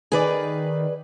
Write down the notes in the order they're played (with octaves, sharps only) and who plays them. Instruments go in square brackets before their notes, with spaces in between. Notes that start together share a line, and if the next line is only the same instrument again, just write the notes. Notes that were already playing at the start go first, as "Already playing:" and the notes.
[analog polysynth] D#3 [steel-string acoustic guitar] G#4 B4 D5